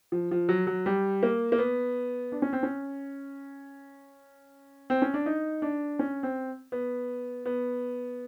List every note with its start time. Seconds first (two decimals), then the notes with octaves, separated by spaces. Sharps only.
0.12 F3
0.31 F3
0.49 F#3
0.67 F#3
0.86 G3
1.23 A#3
1.52 A#3
1.59 B3
2.32 D4
2.42 C#4
2.53 C4
2.63 C#4
4.90 C4
5.02 C#4
5.14 D4
5.26 D#4
5.62 D4
5.99 C#4
6.23 C4
6.72 B3
7.46 B3